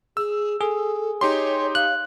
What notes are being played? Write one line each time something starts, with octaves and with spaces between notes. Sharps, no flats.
G#4 E6
G#4 A4
D#4 G4 C#5 C6
F5 F#6